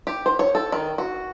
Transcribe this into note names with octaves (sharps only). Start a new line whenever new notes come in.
G4
C5
C#5
A4
D#3
F#4